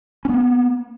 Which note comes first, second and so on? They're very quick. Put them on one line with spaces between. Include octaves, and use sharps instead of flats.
C#4 B3 A#3